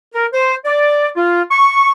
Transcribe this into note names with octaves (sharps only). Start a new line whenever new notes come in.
A#4
C5
D5
F4
C#6